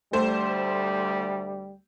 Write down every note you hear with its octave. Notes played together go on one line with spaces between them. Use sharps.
D2 G3 A3 C5